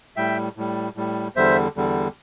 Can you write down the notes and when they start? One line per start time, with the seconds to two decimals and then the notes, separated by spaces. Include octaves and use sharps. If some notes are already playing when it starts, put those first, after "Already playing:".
0.16 A2 G3 E5 G5
0.57 A2 G3
0.96 A2 G3
1.36 E2 D3 G3 C5 E5
1.76 E2 D3 G3